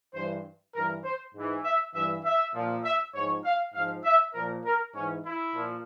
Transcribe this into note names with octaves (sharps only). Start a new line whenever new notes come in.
G2 E3 C5
G2 E3 A#4
C5
G#2 E3
E5
G2 E3 E5
E5
A#2 F3
E5
G#2 F3 C#5
F5
G#2 F3 F5
E5
A#2 F3 A#4
A#4
G#2 E3 C#4
E4
A#2 F3